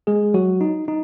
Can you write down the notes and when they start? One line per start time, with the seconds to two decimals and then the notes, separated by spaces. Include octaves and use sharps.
0.07 G#3 G#4
0.34 F#3 F#4
0.61 D#4
0.88 D#4